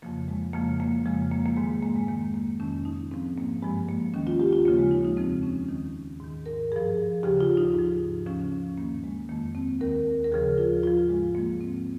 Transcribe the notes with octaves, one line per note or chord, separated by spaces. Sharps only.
F2 C#3 F3 A#3
G#3
F2 C#3 F3 A#3
A#3
F2 C#3 F3 G#3
A#3
A#3
G#2 D#3 G#3
G#3
A#3
G#3
F2 D#3 A#3
A#3
F2 C3 D#3 C#4
D#4
G#2 F3 C4
A#3
G2 F3 G#3
A#3
D#2 D#3 C#4
F4
G4
F4
D#2 C#3 F3 A#3
G#3
D#4
D#4
F2 C#3 F3 C4
C#4
D#2 D#3 D#4
G#2 D#3
A#4
G2 F3 G#4
D#2 C#3 F3 G4
F4
D#4
G#2 F3
D#2 C#3 F3 C#4
C#4
G2 D#3 A#3
G#3
F2 D#3 A#3
C4
D#2 D#3 A#4
A#4
D#2 C#3 F3 G#4
F4
G#2 F3 F4
G#3
G#2 F3 A#3
C4